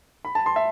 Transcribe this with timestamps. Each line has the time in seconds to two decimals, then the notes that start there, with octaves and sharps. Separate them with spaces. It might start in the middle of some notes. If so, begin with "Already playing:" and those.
0.25 B5
0.35 A5
0.46 C6
0.56 E5